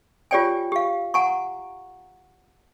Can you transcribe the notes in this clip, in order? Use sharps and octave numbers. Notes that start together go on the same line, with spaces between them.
F4 G4 C#5 D5 G5 G#5
G4 F5
F#5 G#5 A#5 C#6